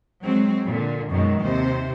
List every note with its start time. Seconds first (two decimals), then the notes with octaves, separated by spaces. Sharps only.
0.23 F#3 G#3 C4
0.67 A#2 D3
1.10 F#2 B2 D#3 G#3
1.42 D#2 C3 C5